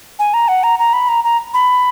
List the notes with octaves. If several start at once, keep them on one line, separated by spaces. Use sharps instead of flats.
G#5
A#5
F#5
A#5
A#5
B5
A#5
A#5
B5